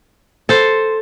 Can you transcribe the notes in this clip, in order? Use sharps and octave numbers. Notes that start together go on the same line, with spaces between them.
A4 C5